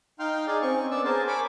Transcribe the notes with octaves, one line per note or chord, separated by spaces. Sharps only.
D#4 F5 G5 C6 F6
D#4 G#4 D5
C4 C#4 C#6
B3 D4 D5 E6
G#4 A#4 C5 A5
C#5 G#5 B5 D6